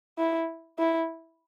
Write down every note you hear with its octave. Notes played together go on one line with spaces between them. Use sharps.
E4
E4